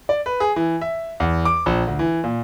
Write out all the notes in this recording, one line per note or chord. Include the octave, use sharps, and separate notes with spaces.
D5
B4
G#4
E3
E5
E2
D6
A#1
D2
E3
A#2